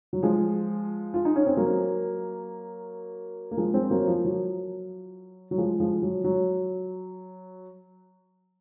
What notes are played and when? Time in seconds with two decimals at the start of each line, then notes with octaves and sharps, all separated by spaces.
0.13 F#3
0.23 F3 G#3
1.14 F4
1.25 D#4
1.36 C#4
1.47 C4
1.57 F#3 A#3
3.51 A#3
3.57 F3 G#3
3.73 G#3 C4
3.90 F#3 A#3
4.07 F3
4.24 F#3
5.51 F#3
5.58 F3 G#3
5.80 F3 G#3
6.02 F#3
6.24 F#3